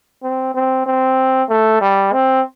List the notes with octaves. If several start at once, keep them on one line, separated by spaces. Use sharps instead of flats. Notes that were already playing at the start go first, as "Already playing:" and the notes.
C4
C4
C4
A3
G3
C4